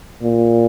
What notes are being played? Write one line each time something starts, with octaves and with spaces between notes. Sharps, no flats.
A#2